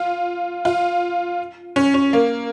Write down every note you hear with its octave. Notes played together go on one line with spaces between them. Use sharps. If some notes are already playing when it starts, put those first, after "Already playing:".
Already playing: F4
F4
C#4
C#4
A#3